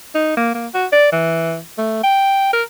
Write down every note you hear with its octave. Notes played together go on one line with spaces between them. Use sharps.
D#4
A#3
A#3
F#4
D5
E3
A3
G5
A#4